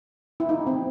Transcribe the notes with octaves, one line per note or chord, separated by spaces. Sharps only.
E4
D#4
C4